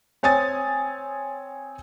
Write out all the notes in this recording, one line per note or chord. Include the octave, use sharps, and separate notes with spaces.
C4 C#5 G#5 D#6 A6